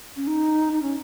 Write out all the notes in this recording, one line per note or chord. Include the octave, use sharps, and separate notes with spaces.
C#4
D#4
D#4
C#4